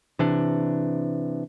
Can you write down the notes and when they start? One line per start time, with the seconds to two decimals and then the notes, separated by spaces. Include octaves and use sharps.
0.19 C3 E3 D4